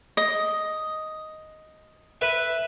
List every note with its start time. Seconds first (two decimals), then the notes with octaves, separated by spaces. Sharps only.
0.17 D#5
2.21 B4 E5